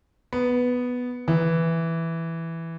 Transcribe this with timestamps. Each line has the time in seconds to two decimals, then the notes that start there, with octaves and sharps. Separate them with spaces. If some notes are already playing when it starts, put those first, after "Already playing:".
0.33 B3
1.28 E3